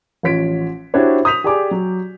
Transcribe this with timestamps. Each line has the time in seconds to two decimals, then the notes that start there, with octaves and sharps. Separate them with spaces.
0.23 A1 F3 C#5 B6 D7
0.94 D4 E4 F#4 G4 C5 C#5
1.25 D#6 G6 B6 F7
1.44 G4 G#4 D5 G#5 D6
1.71 F#3